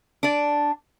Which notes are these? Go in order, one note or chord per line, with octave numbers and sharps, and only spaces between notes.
D4 D5